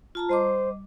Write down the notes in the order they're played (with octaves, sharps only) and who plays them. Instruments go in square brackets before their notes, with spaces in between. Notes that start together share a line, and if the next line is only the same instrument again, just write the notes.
[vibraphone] F4 A5 A#5
[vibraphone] G3 D#5 D6 [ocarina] C5